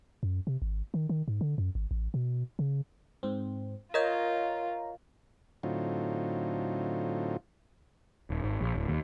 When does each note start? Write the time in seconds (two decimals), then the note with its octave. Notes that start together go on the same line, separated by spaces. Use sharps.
0.23 F#2
0.47 C3
0.62 G#1
0.94 D#3
1.09 D#3
1.28 G#2
1.41 D3
1.58 F#2
1.75 G#1
1.91 A1
2.14 B2
2.59 C#3
3.23 G#2 C4
3.94 F4 A#4 C#5 D#5 A#5 G6
5.63 A2 D3 F#3 C4 D#4 F4
8.30 D#1
8.44 G#1
8.61 A#1
8.75 D1
8.88 D#2